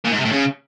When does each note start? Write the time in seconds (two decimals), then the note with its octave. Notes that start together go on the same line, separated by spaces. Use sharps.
0.05 A#2
0.12 G#2
0.18 C3
0.25 A2
0.32 C#3